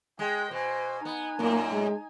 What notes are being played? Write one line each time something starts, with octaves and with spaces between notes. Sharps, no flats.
G#3 G#4 G5
B2 C5 G#5
B3 D#4 G#5
F#2 A2 A#3
G#3